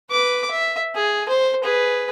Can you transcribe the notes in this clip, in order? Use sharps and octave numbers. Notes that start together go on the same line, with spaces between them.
B4 D6
E5
G#4
C5
G#4 B4